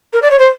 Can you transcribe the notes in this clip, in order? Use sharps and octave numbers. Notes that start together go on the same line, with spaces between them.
A#4
D5
C#5
C5